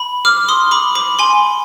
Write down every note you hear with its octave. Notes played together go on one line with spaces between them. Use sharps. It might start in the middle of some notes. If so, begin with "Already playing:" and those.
Already playing: B5
D6 F6
C6 D#6
B5 D6
B5 D6
G#5 C6